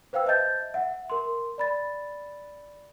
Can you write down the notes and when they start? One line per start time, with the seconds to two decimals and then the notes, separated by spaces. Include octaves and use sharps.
0.13 B4 C5 F5 G5 E6
0.26 C5 D#5 E5 A5 G6 A6
0.74 E5 F#5
1.10 A#4 C6
1.58 D5 B5 A6